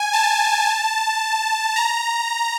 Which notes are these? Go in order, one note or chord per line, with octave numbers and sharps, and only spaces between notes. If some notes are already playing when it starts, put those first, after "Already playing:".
Already playing: G#5
A5
A#5